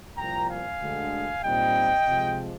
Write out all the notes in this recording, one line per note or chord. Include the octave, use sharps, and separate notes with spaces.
C2 A#2 F3 G5 A#5
F5 G#5
D2 D3 G#3
A#2 G3 C4 D#4 D#5 G5
C3 F3 G#3